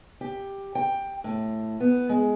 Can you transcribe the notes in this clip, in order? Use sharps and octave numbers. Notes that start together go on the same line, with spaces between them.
G4
G5
A2
B3
G#3